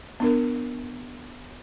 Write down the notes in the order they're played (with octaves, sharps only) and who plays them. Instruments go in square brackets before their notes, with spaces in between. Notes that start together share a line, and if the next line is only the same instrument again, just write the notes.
[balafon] B3 D4 A#4